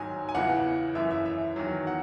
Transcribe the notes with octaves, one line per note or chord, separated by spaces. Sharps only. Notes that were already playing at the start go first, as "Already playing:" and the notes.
Already playing: G#2 D#3 F#3 G#5
G#5
E2 C#3 E3 F#5
F#2 E3 E5
E5
E5
E2 D#3 F#3
F#5